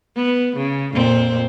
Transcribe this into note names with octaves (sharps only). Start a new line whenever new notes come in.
B3
C#3
F2 A#2 C4